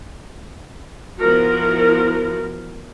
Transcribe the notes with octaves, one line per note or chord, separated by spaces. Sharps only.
F3 B3 E4 F#4 A#4